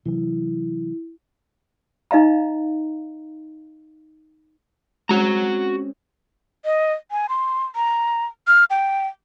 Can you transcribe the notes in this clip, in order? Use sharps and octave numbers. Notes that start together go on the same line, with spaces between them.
C3 E3 F#3 E4
D#4 D#5 F5 A#5
G#3 C4 C#4 F#4 A#5
D#5
G#5
C6
A#5
F6
G5